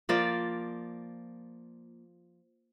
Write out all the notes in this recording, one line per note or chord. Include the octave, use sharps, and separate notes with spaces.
F3 A#3 F4 D5